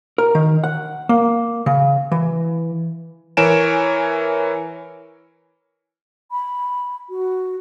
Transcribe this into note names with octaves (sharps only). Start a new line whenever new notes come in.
A#4
D#3
F#5
A#3
C#3
E3
E3 A#4 C#5 G#5 D7 E7
B5
F#4